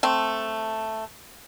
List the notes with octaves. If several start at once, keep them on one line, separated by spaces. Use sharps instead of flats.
A3 C4